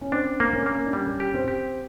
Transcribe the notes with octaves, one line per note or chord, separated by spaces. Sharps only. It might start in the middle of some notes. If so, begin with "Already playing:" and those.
C#4
C4 D4
A#3
C#4
A#3
D4
G3 C#4
G4
C4
G4